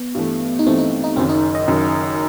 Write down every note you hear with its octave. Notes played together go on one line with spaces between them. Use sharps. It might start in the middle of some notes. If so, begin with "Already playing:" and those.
Already playing: B3
G2 E3 A3
D#4
G2 E3 A3 C4
D#4
D#4
F#1 F#2 D#3 C4
D#4
D#5
F#1 F#2 D#3